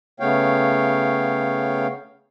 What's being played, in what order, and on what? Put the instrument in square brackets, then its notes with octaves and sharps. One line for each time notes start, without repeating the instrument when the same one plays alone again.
[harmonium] C#3 A3 B3 C#5 F5 G5